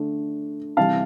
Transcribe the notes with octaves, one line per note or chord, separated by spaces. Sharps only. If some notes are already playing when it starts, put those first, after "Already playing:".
Already playing: D3 A3 D4
C3 E3 G3 F5 A5